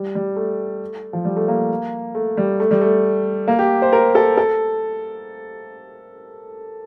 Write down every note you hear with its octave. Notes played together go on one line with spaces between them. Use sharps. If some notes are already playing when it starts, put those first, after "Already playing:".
Already playing: G3
G3
A3
F3
G3
A3
A#3
A3
G3
A3
G3
A3
A#3
G4
C5
A#4
A4
A4